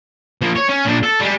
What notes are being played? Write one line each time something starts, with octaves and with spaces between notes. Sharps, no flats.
F3 A#3
C#5
C#4
A#2 D4
A4
G3 G#3